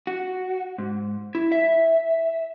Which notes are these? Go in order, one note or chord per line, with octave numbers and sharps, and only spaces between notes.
F#4
G#2
E4
E5